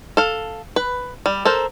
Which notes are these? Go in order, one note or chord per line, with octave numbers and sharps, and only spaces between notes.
A4 F5
B4
G3
A4 A#4 C5